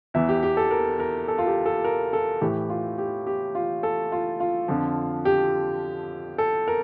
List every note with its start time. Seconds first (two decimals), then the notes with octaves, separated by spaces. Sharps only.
0.14 E2 E3 E5
0.29 G4
0.43 G4
0.57 A4
0.71 A#4
1.00 A#4
1.28 A4
1.38 F4
1.47 G4
1.66 A4
1.84 A#4
2.13 A4
2.41 A2 E3 G4
2.69 F4
2.98 G4
3.27 G4
3.55 F4
3.83 A4
4.12 F4
4.40 F4
4.68 F2 D3 F3
5.25 G4
6.38 A4
6.68 A#4